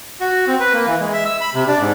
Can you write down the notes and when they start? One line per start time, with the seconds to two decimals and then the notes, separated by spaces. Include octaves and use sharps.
0.21 F#4
0.47 C4
0.60 B4
0.74 A#3
0.87 E3
1.00 G#3
1.13 E5
1.26 E6
1.41 B5
1.55 C3
1.68 D4
1.80 G#2